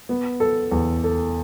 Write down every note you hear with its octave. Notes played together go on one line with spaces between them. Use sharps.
B3
A4
E2
A4